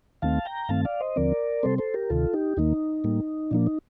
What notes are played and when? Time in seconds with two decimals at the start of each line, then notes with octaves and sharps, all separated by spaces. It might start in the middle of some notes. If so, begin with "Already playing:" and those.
0.22 D#2 D#3 A3 C4 F5 A5
0.45 G5 A#5
0.69 G2 D#3 A3 C4 F5 A5
0.85 D5 F5
1.01 C5 D#5
1.16 D#2 D3 F3 C4 A#4 D5
1.63 C3 G3 C4 A4 C5
1.78 A4 C5
1.94 G4 A#4
2.10 D2 C3 D#3 F4 A4
2.34 D#4 G4
2.57 D#2 D#3 A#3 D#4
3.04 A2 G3 A#3
3.51 A#2 F3 A#3 D4
3.67 D#4